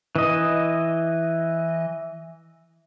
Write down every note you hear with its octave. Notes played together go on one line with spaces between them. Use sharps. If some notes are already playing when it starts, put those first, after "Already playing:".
E3 D#5